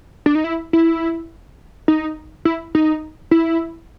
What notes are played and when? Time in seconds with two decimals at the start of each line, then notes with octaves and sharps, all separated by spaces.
0.26 D4
0.35 D#4
0.44 E4
0.73 E4
1.88 D#4
2.45 E4
2.75 D#4
3.31 E4